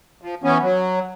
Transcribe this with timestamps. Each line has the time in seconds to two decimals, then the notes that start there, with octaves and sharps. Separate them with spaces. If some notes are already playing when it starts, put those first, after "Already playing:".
0.22 F3
0.44 E3 B3 C#4
0.62 F#3